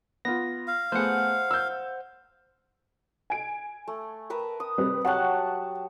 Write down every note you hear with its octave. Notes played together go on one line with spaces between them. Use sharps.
B3 F4 A#6
F5
A3 B3 G#4 C5 F#5
E6 G6
G#5 D7
A3
A#4 B4 E5
D#6
G3 C4 B4
F#3 G4 F#5 A5 C#6 F#6